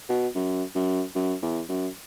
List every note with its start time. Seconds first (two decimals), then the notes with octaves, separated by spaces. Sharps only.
0.09 B2
0.35 F#2
0.75 F#2
1.16 F#2
1.42 E2
1.69 F#2